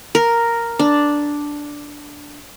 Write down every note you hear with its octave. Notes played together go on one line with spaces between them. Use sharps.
A#4
D4